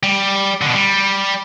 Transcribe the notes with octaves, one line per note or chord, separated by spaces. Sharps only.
G3
B2 D3
G3